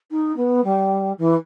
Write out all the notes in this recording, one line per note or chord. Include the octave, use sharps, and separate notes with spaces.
D#4
B3
G3
E3